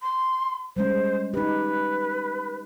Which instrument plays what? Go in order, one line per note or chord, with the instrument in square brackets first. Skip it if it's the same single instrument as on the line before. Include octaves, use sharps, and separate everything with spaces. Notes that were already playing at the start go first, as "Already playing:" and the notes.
[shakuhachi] C6
[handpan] G3 G#3 C#4 [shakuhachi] C5
[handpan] D#4 G4 [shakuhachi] B4